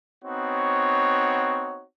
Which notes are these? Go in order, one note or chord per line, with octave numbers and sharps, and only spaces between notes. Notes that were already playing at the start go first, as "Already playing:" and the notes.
B3 C4 D#4 F#4 C#5